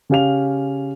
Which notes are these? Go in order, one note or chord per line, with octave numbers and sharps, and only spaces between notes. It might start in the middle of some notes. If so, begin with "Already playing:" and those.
C#3 C#4 G4 F5 F7